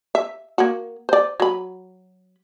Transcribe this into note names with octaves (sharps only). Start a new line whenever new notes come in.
E5
A#3 F#4
C5 D5
F#3 B5